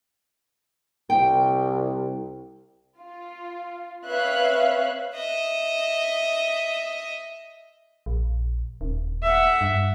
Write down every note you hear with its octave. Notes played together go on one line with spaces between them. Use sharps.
C2 G5
F4
C4 B4 C#5 E5 F5 F#6
D#5 E5
A#1
D#1
E5 F#5
G2